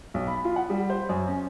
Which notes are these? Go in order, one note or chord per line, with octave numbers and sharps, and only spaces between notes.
B1
B5
F4
F#5
G3
C5
F#2
C#4